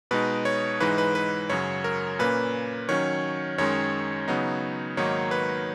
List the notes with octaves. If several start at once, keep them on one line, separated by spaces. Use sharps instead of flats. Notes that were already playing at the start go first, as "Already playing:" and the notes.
B2 G#3 D#4 B4
C#5
G#2 E3 G#3 D#4 B4
B4
B4
F#2 C#3 F#3 C#5
A#4
A#2 A#3 C#4 B4
D#3 F#3 C#4 C#5
F#2 D#3 G#3 C#4 C#5
C#3 F#3 B3 D#4
G#2 D#3 F#3 A#3 D#4 C#5
B4